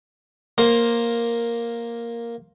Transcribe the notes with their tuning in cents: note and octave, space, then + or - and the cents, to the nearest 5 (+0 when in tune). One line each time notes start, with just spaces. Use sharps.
A#3 +0 C5 +15